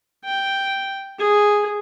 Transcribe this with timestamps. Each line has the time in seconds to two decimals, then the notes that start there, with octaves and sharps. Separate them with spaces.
0.25 G5
1.19 G#4